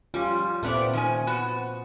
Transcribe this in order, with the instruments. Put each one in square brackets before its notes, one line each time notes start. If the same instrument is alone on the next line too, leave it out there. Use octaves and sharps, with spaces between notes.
[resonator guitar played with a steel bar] G3 C#4 [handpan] F4
[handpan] A#2 C4 [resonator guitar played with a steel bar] A3 B3 D5
[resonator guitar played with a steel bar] D#3 C#4 G#5
B3 F#4